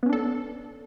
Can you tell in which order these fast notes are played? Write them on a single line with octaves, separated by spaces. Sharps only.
B3 C#4 D4 A4